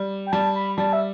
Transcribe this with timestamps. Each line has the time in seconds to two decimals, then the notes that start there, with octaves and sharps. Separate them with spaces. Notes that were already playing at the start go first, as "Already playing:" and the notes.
Already playing: G3
0.26 G5
0.32 G3 A5
0.55 B5
0.77 G3 A5
0.93 E5